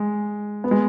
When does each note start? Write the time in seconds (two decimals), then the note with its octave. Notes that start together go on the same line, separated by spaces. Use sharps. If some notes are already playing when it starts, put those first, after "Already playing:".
Already playing: G#3
0.64 B3
0.71 G#3